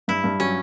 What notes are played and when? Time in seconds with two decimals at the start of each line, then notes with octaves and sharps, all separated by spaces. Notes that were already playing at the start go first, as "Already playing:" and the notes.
0.08 G2 E4
0.24 G2
0.40 F#3 C#4